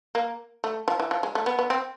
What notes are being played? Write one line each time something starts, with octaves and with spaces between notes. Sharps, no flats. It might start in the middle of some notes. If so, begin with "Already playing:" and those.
A#3
A3
F3
E3
F3
G#3
A3
B3
B3
C4